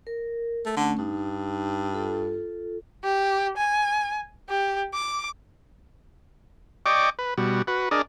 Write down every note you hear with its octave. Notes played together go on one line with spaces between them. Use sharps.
A#4
A3
D3 A3 C#4
G2 D#4
F4 A4
G4
G#5
G4
D6
D5 D#5 G5 C#6 D6
B4
B2 G3 F#4
F#4 B4
D4 G#4 A#4 D5 D#5